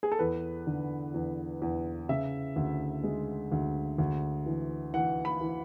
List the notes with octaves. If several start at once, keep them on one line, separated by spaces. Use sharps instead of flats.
G#4
A4
E2 B4
D3
E2
E2
C#3 E5
D2
G#3
D2
D2
E3
E3 F#5
B5
E3